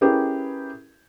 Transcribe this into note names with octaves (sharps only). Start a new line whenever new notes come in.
C#4 E4 G4 G#4 A#4 B4